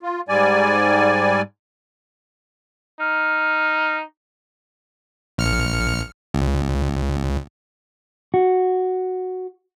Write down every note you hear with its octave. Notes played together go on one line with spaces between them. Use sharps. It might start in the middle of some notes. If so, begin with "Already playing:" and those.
F4
G#2 G3 D5 G#5
D#4 F6
A#1 F6 C#7
C#2
F#4